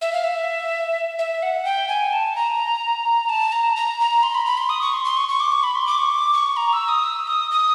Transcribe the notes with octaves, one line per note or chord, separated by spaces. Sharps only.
E5
F5
E5
E5
F#5
G5
G#5
A5
A#5
A5
A#5
A#5
A#5
C6
B5
B5
C6
D#6
C#6
C6
C6
C#6
C#6
D6
C#6
B5
C6
D6
C#6
D6
C#6
A#5
E6
D#6
E6
D#6
D#6